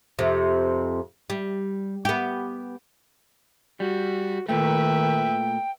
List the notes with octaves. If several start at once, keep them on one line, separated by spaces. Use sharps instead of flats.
F2 C3
G3
B3 G4
G3 F#4
A#2 D#3 A3 B4 E5 G5